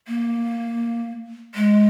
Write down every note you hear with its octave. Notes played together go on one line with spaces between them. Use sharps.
A#3
G#3